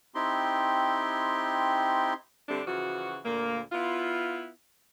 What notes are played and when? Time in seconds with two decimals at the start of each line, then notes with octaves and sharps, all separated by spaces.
0.15 C4 D#4 E4 G4 C6
2.48 D3 G3 A3 C4 D4
2.66 C#3 E3 F3 F#4
3.23 D2 A#2 A#3
3.72 B3 E4 F4